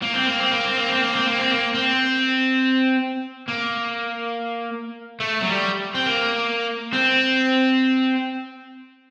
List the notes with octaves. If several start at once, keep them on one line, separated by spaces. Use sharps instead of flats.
A#3
C4
A#3
C4
A#3
C4
A#3
C4
A#3
C4
A#3
C4
A#3
C4
A#3
A3
F#3
G3
C4
A#3
C4